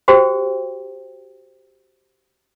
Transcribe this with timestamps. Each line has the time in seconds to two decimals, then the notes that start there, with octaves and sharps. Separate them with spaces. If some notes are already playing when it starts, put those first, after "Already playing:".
0.08 F#4 G4 C5 G5